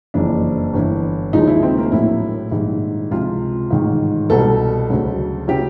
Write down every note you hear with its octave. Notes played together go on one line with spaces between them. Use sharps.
F#1 F2 C#3 E3 D4
G1 G2 E3
D#2 C#3 F3 G#3 D#4
E4
C4
A#3
A#1 A2 F#3 E4
A#1 G#2 D#3 G3
C#2 C3 F3 G#3 F4
A1 G#2 D#3
C2 B2 G3 A4
D2 C#3 F#3
C#3 F#3 G4